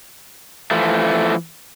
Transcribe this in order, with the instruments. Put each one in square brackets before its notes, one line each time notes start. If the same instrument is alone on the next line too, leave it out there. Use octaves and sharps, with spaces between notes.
[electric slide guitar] E3 F3 A3